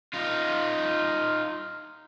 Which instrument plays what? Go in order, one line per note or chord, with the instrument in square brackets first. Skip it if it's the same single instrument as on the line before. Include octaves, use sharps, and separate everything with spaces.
[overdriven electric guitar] D#4 F4